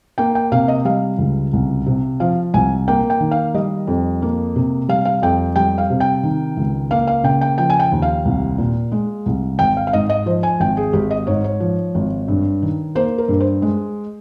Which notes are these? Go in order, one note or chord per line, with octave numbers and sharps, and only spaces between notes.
A#3 G5
G5
C3 F5
D#5
G3 F5
C#2
C2
C3
F3 F5
C2 G#5
A#3 G5
G5
D#3
F5
G3 D#5
F2
A#3
C3
G3 F5
F5
F2 G5
G3 G5
F5
C3
G5
D#3
C#2
A#3 F5
F5
C#3 G5
G5
F3 G5
G#5
G5
D#2
F5
C2
A#2
G#3
C2
G#1 G5
F5
F5
G#2 D#5
D#5
F3 C5
G#5
G#1 G5
G#4
G#1 G4
D#5
G#2 C#5
C#5
F3
G#1
G2
D#3
A#3 C5
A#4
G2
C5
G#3